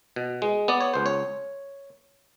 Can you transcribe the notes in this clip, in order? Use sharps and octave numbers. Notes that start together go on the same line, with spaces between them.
B2
G#3
B3 D5
C#5
C#2 C5
C#5